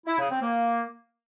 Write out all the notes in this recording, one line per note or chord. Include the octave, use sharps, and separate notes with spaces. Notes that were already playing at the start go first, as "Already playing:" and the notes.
E4
C#3
C4
A#3